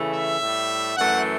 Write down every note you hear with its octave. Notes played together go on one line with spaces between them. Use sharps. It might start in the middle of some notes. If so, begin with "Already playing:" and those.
Already playing: C#3 E3 A3
E5
A2 G3
F#2 E3 A3 F#5